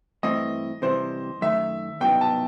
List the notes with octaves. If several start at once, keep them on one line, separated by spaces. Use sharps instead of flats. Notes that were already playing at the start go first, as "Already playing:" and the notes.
G2 E3 A3 C4 E4 D#5
C3 E3 G3 C5
F#2 D#3 A3 E5
C2 B2 F#3 B3 D#4 G5
A5